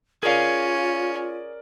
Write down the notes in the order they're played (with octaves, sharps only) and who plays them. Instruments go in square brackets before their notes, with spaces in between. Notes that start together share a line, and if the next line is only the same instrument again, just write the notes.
[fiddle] C#4 [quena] F4 [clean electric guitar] G#4 F5 [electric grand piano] A#4 D5